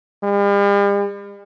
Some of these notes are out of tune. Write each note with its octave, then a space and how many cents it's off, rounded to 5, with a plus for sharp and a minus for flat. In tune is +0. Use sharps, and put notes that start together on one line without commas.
G3 +45